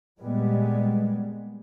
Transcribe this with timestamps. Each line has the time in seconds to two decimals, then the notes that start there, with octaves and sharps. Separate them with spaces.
0.21 A#2 G3 G#3 B3